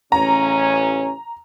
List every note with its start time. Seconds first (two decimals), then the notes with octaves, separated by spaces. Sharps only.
0.12 A1 C#3 C#4 A#5